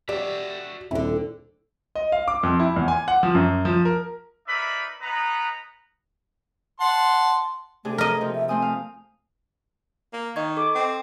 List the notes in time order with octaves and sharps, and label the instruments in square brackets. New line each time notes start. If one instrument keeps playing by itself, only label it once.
[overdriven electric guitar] F#4 E5 [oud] G4 [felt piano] D5
[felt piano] D#1 C4 [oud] D3 A3 [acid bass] E4
[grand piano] D#5
F5
D6
F2
E4
E2
G#5
F#5
F3
F#2
F3
A#4
[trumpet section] D#4 A#4 B4 D5 E5 B5
B3 D#4 B4 A#5
[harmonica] F#5 A5 C6
[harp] C3 D4 G#4 [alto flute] A3
[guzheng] A#4 D#5
[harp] C3 F3
[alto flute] E5
[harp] A3 C4 D#6 [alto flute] G#5
[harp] F5
[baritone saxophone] A#3
[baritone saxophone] D#3 [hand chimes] D#5 C#6 G#6
[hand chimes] A4 [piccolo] D6
[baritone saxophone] C4